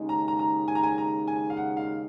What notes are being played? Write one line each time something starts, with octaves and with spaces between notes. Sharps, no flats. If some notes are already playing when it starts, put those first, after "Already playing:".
Already playing: D#2 C#3 G#3 D#4
A#5
A#5
A#5
G#5
A#5
G#5
A#5
G#5
F5
F#5
F5